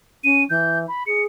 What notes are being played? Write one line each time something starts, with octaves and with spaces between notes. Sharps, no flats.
C#4 D#7
E3 G6
B5
G#4 C#7